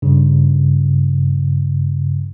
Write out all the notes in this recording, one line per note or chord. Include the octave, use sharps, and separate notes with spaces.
G2 C#3